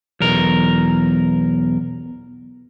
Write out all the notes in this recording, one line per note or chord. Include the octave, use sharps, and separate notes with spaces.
B1 E2 A#4